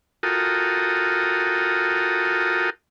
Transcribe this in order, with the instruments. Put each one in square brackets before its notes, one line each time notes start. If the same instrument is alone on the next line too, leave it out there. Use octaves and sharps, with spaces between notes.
[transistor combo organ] F4 F#4 A4 A#4 G5 D#6